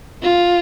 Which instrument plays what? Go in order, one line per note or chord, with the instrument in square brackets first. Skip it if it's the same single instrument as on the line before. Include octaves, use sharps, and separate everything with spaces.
[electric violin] F4